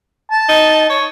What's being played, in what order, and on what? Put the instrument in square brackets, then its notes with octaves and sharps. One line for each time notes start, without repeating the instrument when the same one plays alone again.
[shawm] A5
[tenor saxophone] D#4
C#5